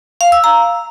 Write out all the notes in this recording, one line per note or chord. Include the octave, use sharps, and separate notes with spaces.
F5
E6
A#5